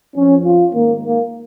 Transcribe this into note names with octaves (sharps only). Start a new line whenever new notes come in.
F2 F3 C#4
F4
G#2 D#3 A#3
A#3